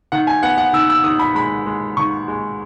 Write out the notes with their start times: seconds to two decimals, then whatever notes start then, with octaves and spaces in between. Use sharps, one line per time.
0.12 D#3 F#5
0.27 G#5
0.43 B3 F#5
0.58 F#5
0.73 D#3 E6
0.90 E6
1.04 D#3 D#6
1.19 B5
1.35 G#3 B5
1.66 G#3
1.97 D#3 C#6
2.28 G#3